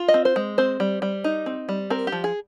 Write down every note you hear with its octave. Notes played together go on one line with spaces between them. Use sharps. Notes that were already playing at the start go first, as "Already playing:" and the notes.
Already playing: F4
D#5
C4
C5
G#3
C4 C5
G3
G3
D#4
C4
G3
C4 A#4
G4
F3
G#4